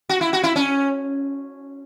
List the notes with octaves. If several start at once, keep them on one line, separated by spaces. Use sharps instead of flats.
F#4
E4
F#4
E4
C#4